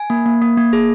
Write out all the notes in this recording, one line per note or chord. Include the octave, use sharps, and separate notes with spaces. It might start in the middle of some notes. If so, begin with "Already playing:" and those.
Already playing: G#5
A#3
A#3
A#3
A#3
G#4